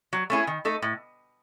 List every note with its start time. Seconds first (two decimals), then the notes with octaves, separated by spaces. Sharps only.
0.13 F#3
0.30 A3 C#4 E4 G#4
0.47 D#3
0.65 A3 D#4 A4
0.82 A2